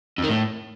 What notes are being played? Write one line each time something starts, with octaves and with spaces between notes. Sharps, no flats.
F2
D#3
A2